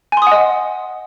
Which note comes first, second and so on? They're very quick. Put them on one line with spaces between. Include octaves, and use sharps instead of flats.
G#5 C6 D#6 F#5 D#5